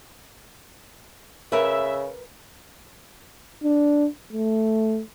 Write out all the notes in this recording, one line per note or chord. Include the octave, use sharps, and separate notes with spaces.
C#3 A#4 B4 E5
D4
A3